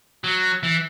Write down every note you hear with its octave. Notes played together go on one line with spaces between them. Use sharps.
F#3
E3